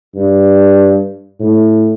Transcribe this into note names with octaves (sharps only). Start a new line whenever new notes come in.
G2
A2